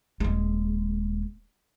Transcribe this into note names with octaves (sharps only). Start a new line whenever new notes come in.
D#1 G#3